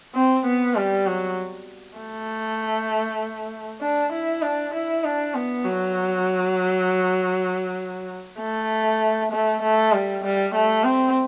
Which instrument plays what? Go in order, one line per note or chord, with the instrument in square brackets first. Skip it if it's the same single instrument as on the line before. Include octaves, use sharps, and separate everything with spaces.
[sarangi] C4
B3
G3
F#3
A3
D4
E4
D4
E4
D4
B3
F#3
A3
A3
A3
G3
G3
A3
C4